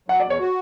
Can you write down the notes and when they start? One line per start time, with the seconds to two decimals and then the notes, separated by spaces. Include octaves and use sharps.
0.09 F#3 F#5
0.20 D5
0.25 E2
0.30 C#5
0.40 F#4